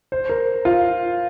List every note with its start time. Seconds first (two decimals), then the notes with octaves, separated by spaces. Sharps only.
0.12 C5
0.29 A#4
0.65 F4